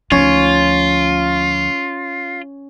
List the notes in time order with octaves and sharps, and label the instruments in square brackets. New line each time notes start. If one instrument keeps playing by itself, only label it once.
[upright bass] D2 F3 [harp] C#4 [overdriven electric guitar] F4